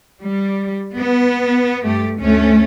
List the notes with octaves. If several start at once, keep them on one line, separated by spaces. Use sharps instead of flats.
G3
B3
G2 A3 G4
D2 A3 C#4